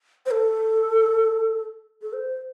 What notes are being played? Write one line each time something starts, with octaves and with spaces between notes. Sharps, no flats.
C5
A4
A4
C5